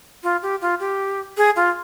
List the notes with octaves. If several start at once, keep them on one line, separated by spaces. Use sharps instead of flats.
F4
G4
F4
G4
G#4
F4